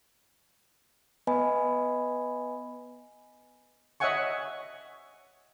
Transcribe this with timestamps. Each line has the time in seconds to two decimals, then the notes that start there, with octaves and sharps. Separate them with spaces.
1.27 B3 B4 D#5 G#5 B5
4.00 C#5 D#5 E5 F#5 G#5 C#6